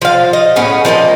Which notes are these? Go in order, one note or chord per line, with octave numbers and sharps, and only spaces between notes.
F3 F5
D#5
A2 B3 C#4 G#4
F3 A#3 D5 D#5